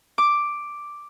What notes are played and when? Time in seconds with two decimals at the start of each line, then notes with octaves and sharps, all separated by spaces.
0.18 D6